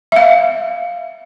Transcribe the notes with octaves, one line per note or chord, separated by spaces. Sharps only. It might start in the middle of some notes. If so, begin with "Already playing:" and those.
E5 F5